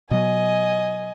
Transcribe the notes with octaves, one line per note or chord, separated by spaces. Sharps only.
B2 F#3 D#5 G#5